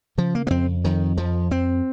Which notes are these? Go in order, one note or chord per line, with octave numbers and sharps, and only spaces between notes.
C#3 F3
A#3
A#3
F2 C4
F2 D#3
F2 F3
F2 C4